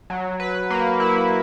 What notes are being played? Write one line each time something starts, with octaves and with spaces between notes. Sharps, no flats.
F#3
B4
A#3
E4